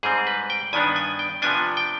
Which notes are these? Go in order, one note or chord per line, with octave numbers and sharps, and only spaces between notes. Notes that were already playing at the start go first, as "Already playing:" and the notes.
G#2 G3 C4 G#4
B4
G5
G2 D#3 B3 D4 G#5
G#5
G5
C3 F3 B3 D4 G#5
G5